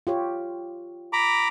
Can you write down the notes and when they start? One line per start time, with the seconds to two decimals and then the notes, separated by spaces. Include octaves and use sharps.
0.07 F4 G4 C#5
1.13 A#5 B5 D6